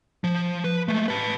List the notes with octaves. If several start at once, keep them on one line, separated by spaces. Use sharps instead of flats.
F3
B4
G#3 A3
B4 A5